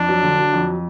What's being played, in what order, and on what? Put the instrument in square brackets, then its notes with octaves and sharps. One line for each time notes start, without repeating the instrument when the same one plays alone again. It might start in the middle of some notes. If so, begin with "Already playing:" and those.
Already playing: [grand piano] F2 [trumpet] D4
[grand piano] F#3
D3
F#3
F2